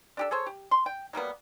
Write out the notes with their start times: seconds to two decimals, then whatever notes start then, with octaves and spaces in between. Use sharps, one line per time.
0.17 D4 G4 A4
0.31 G#4 A4 C5 C#5
0.46 G4
0.71 C6
0.86 G5
1.13 F#3 G3 A#3 B3